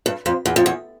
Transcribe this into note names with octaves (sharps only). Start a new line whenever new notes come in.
G2
F2
E2
F2
E2